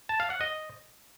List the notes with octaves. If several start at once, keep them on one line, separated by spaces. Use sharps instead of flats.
A5
F5
F#5
D#5